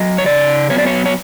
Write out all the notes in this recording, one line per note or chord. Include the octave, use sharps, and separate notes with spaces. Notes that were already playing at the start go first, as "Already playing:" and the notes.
Already playing: F#3 D#5
C#5
C#3 D5
F#3 B3 C#5
D5
C#5
C#5